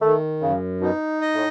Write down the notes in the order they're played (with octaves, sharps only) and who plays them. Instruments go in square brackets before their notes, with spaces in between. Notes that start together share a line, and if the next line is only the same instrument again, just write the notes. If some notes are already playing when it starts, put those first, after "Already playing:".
[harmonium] D#3 [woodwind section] A3
[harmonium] F#2 [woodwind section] C#3
[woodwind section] B2 [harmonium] D#4
[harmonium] D#5
[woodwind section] A2